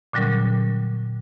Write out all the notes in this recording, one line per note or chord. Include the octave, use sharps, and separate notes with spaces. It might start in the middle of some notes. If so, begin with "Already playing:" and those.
A#2 D3 F#3 G3 C#4 A#4